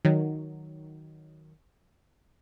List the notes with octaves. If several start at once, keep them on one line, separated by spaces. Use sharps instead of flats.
D#3 F#3